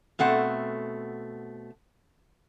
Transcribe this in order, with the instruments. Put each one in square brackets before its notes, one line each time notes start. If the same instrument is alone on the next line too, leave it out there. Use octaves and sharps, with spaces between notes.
[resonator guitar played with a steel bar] B2 A3 C4 F#5